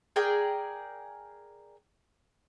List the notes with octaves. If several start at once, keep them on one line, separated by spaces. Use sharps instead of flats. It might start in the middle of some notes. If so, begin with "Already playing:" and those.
G#4 A#4 D5 G5